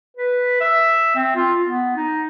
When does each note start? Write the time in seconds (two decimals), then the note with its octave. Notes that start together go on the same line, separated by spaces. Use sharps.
0.17 B4
0.61 E5
1.16 C4
1.35 F4
1.66 B3
1.96 D#4